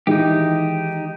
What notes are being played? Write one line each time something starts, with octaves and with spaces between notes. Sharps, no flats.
D#3 E3 G#3 D#4 G4